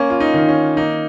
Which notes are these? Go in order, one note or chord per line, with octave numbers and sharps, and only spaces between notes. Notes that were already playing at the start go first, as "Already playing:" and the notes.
Already playing: A#3 C#4
F4
D#4
D#3
C#4
A#3 D#4